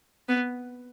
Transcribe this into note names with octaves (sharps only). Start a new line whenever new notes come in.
B3